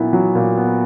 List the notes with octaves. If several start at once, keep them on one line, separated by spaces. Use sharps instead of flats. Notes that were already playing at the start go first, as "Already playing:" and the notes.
Already playing: A#2 F#3 B3 E4
F#3
A#2
B3